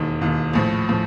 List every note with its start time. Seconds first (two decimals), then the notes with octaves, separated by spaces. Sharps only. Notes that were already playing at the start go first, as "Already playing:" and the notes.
Already playing: E1 D#2 D#3
0.21 E1 D#2 D#3
0.53 A#1 A2 F3
0.89 A2 F3